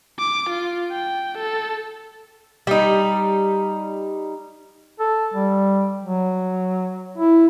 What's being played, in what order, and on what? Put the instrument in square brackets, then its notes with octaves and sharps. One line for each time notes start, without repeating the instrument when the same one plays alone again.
[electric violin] D6
F4
G5
A4
[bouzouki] G3 D#4
[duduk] A4
G3
F#3
E4